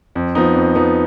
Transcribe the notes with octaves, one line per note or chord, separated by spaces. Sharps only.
F2
F3 B3 D#4
F2
F3 B3 D#4